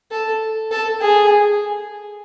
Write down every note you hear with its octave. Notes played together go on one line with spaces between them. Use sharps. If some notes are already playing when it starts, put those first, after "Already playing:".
A4
A4
G#4